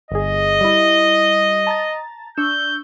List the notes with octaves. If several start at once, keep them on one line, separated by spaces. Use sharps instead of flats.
G1 G#4 D#5
G3 E4
A5 A#5 A6
D4 C#6 E6 G6